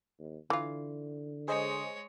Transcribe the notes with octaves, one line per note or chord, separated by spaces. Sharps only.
D#2
D3 E3 F4
G#3 G#4 C5 C#5 D#5